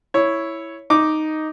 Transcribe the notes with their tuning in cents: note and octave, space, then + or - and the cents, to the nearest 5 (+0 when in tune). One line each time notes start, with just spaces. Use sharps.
E4 +0 C#5 +0
D#4 +0 D6 +0